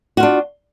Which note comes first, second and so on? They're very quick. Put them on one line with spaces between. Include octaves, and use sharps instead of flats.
F#4 F4 D4